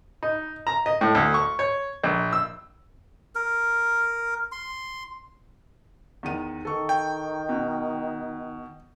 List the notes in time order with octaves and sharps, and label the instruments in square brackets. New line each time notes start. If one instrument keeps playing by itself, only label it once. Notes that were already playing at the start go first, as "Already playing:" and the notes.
[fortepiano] D#4
A#5
D#5
A2
D2
C#6
C#5
A#1
E6
[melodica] A#4
C6
[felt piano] E2 D#3 D#7
[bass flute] D#3 [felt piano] A4 C#6
[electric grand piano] G5
[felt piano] B2